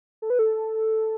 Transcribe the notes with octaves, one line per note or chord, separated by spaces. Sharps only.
A4
B4
A4